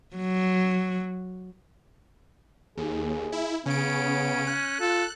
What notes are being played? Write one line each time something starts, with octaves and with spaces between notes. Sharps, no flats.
F#3
D#2 G#4
E4
C#3 B3 C#4 D7
F#6
F4 A4